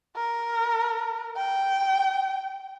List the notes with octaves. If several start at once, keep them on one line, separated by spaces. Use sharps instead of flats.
A#4
G5